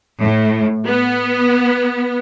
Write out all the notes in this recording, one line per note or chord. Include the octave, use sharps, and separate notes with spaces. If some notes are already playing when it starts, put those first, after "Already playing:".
A2
B3